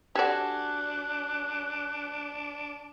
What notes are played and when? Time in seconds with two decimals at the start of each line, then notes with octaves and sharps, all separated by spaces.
0.15 D4 F#4 G4 A4 D5 G#5 F#6